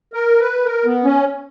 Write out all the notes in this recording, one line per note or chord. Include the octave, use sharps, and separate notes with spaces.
A#4
B4
A#4
B3
C#4